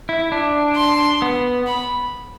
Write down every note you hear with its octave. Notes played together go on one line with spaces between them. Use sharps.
E4
D4
C6
B3
B5